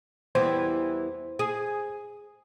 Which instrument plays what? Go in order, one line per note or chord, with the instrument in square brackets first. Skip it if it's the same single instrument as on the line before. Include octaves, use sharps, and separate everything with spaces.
[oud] E2 E3 G3 [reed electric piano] C5
[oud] G#4